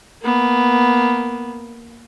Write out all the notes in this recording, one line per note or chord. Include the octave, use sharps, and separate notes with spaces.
A#3 B3